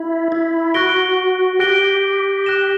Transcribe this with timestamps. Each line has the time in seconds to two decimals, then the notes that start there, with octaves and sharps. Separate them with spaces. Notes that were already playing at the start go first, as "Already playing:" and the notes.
Already playing: E4
0.32 E4
0.74 F#4 F#6 A#6 D7 G7
1.59 G4 F#6 A#6 D7 G7
2.44 F#6 A#6 E7 G7